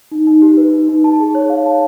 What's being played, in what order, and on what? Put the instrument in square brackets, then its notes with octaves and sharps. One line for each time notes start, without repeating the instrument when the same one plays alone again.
[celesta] D#4
D#4
G4
B4
D#4
D#4
A5
G#4
C#5
F5
A5